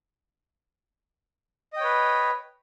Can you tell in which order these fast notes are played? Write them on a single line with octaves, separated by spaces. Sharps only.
D#5 G5 C#5 B4